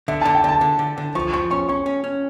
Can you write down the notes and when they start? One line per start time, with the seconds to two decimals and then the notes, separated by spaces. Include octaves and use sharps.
0.08 D3 E5
0.21 D3 A5
0.35 G5
0.44 D3 A5
0.61 D3
0.79 D3
0.98 D3
1.15 F3 C#6
1.33 F3 C#6
1.51 C#4 C#6
1.68 C#4 C#6
1.86 C#4
2.04 C#4